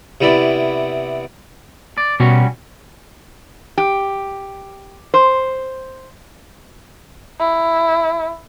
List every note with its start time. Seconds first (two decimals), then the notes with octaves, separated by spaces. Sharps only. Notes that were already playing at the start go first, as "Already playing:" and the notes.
0.21 C3 B3 E4 D5
1.98 D5
2.20 B2 G3 C#4 F#4
3.78 G4
5.14 C5
7.40 E4